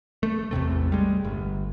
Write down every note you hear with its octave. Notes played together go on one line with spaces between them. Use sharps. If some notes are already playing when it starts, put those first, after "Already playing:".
A3
A1 E2 C3 A3
G3 G#3
G1